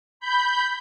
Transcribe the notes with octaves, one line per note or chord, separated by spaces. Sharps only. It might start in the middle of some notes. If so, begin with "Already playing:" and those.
B5 G6